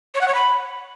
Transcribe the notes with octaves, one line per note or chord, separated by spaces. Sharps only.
C#5
F#5
C#5
B5